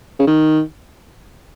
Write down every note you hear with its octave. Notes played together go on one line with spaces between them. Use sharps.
C#3
D#3